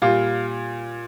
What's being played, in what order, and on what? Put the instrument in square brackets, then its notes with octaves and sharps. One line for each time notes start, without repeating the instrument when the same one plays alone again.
[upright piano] A#2 G3 F4